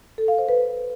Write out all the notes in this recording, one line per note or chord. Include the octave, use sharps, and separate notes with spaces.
A4
F5
C5
B4